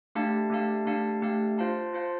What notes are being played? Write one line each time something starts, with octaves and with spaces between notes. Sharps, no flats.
A3 D4 G4 F5 A5
A3 D4 G4 F5 A5
A3 D4 G4 F5 A5
A3 D4 G4 F5 A5
F4 C5 F5 A5
F4 C5 F5 A5